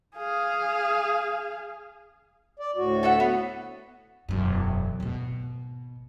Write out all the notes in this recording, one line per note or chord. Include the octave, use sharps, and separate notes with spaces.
G#4 F5
D5
D2 A2 F#4
A4 E5 F#5
B3
E1 F#2
G#1 B2